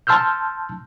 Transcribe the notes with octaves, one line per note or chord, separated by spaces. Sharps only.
A5 C6 E6 F6 G6